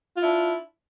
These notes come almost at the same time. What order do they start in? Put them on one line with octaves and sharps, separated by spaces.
F4 E4 D4